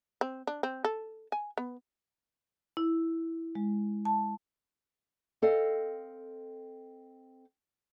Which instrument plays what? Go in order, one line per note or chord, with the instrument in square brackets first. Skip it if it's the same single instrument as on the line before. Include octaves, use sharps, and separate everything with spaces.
[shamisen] C4
D4
C4
A4
G#5
B3
[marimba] E4
G#3
A5
[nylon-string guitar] C4 A4 D#5 F5